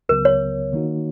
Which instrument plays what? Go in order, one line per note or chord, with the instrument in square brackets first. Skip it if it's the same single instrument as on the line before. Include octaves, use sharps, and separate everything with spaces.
[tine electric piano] C#2 C#3 F#3 B3 [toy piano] A#4
[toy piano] C#5
[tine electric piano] D#3 A#3 D#4 F#4